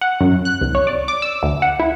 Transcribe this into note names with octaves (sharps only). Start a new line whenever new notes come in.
F#5
F#2
F#6
C2
C#5
D5
D6
E6
D2
F#5
E4